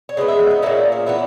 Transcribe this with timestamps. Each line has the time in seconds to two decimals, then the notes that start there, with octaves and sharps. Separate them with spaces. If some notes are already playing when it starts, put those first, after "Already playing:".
0.09 C#5
0.17 C#3 G#3 B3 D#5
0.28 E5
0.40 F#4
0.51 D#4
0.62 A#2 A#3 C#4 E4
0.92 G#4
1.06 E3 B3 E4